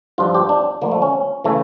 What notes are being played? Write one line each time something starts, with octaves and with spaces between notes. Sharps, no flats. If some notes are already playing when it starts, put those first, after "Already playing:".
G2 D3 F3 F4
G4
D4
D2 D3 F3 A#3
A3
C#4
C#3 E3 A3